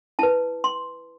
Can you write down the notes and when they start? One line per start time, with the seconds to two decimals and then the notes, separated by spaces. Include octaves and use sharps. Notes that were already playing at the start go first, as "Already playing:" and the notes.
0.19 E4 B4 A5
0.64 C6